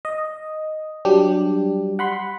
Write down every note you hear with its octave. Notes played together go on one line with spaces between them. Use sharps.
D#5
F#3 G3 D4 G4
F#5 B5 C6